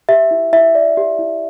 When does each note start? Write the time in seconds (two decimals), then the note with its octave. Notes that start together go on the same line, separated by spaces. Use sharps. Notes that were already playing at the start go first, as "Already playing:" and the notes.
0.09 G4 E5
0.31 E4
0.53 E4 E5
0.75 D5
0.97 G4
1.19 E4